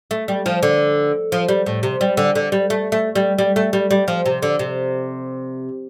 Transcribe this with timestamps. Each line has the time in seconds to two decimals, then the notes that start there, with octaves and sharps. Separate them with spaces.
0.11 A3
0.28 G3
0.46 F3
0.63 D3
1.32 F3
1.49 G3
1.66 A2
1.83 C3
2.01 G3
2.17 D3
2.35 D3
2.52 G3
2.70 A3
2.92 A3
3.15 G3
3.38 G3
3.56 A3
3.73 G3
3.91 G3
4.08 F3
4.26 C3
4.43 D3
4.59 C3